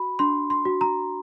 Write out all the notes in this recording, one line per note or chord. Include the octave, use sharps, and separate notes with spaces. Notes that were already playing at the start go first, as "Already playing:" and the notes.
Already playing: F#4 B5
D4 C6
C6
F#4
A#5